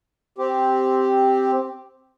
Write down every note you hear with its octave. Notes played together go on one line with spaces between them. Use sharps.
C4 G4